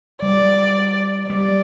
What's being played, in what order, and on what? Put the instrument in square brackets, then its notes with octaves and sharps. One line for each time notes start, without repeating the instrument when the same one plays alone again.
[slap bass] G3 [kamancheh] D5
[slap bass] G3 [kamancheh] D5